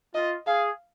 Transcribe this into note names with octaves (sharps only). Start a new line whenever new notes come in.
F4 D#5
G#4 F5